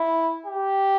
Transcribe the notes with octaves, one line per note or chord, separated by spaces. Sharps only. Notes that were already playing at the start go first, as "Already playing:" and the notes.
Already playing: E4
G4